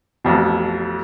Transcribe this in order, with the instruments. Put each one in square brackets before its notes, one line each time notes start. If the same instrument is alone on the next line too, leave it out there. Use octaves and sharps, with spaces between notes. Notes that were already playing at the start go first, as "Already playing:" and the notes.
[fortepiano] A1 F2 B2